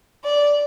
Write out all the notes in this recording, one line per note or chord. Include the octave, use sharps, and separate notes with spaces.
D5